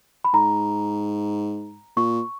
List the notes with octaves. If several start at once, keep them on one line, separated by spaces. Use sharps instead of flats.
B5
G#2 A#5
A#2 C#6